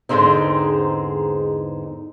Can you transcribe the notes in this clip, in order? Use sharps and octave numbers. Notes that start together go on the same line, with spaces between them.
E2 G#2 D3 G#3 C4 D#4